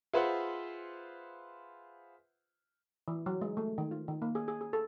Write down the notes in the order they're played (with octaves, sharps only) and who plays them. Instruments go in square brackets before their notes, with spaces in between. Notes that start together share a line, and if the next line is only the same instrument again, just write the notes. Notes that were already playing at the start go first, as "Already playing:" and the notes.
[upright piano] F4 G#4 B4 C5 E5 F#5
[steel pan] E3
F#3
G#3
A3
D#3
F4
D#3
A#3
G#4
G#4
G#4
A4